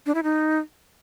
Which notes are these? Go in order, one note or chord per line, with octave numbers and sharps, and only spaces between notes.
D4
E4
D#4